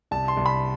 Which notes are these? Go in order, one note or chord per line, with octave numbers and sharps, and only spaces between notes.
C2 A5
C6
C2
B5